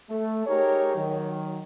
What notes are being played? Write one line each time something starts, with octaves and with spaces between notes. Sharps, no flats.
A3
D#4 G4 G#4 A#4 C#5
D#3 F#3